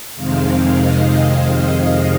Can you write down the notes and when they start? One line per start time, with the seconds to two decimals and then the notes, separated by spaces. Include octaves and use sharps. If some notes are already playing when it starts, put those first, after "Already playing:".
0.16 F2 C3 D#3 G#3 C4 F5
0.76 D#5